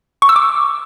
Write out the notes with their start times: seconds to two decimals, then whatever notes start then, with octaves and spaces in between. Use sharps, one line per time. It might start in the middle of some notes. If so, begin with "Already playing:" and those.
0.22 C#6
0.29 E6
0.36 D6